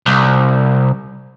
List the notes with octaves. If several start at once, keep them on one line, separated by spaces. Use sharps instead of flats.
C2